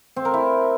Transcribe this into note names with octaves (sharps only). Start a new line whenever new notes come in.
C4
A#4
E4